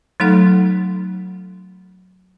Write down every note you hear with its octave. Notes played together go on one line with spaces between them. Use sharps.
F#3 A3 D#4 A4 F#5